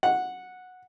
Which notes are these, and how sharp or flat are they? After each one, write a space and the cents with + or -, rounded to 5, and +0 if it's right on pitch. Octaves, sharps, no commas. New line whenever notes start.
F#5 -10